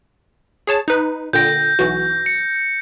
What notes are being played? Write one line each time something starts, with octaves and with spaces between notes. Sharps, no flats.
G#4 C#5 A5
D#4 B4
A#2 D3 G5 G6 A#6
B1 E3 F#4
C#7